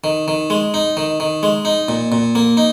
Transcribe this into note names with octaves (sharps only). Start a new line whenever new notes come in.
D#3
D#3
G#3
D#4
D#3
D#3
G#3
D#4
A#2
A#2
A#3
D#4